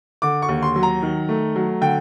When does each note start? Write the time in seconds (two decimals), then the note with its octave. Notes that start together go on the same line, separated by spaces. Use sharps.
0.22 D3 D6
0.42 C#6
0.49 D#2
0.63 C6
0.76 F#3
0.83 A#5
1.02 D#3
1.29 A3
1.56 F#3
1.81 D3 G5